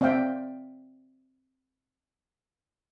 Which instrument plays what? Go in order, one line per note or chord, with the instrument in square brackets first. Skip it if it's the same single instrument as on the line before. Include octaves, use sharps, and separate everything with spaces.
[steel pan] C4 D5 E5 F5 G5